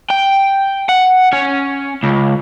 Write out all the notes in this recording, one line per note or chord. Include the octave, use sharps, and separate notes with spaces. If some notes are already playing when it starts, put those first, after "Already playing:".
G5
F#5
C#4
C#2